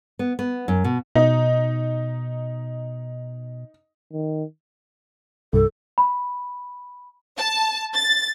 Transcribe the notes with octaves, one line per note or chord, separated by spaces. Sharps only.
B3
B3
F#2
B2
B2 D#4
D#3
C2 G2 A4
B5
A5
A6